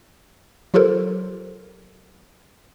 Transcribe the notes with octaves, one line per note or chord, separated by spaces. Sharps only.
F#3 F4 G4 A4 A#4 C5